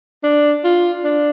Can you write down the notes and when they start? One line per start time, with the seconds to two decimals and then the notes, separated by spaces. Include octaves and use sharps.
0.24 D4
0.64 F4
1.04 D4